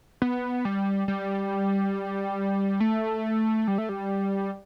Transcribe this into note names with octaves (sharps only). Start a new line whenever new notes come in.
B3
G3
G3
A3
G3
A3
G3